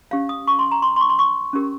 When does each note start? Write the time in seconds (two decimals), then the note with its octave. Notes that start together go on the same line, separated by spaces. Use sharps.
0.11 C#4 G4 C#5 F5
0.29 D#6
0.47 C#6
0.59 C6
0.71 A#5
0.82 C6
0.96 C6
1.01 C#6
1.09 C6
1.19 C#6
1.53 C#4 G4 A#4